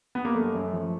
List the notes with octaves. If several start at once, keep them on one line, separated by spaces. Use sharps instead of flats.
B3
A#3
F#2 A3
F#2
F3